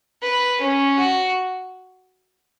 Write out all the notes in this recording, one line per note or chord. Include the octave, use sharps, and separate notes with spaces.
B4
C#4
F#4